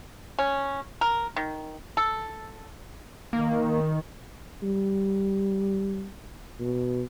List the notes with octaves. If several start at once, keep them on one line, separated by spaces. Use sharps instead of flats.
C#4
A#4
D#3
A4
D#3 A#3
G3
B2